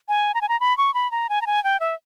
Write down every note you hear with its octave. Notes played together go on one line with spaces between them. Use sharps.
G#5
A#5
G#5
A#5
B5
C#6
B5
A#5
G#5
A#5
G#5
G5
E5